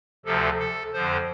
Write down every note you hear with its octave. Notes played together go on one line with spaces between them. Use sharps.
D2 C3 F3 A4
A4
F2 D3 F3 C5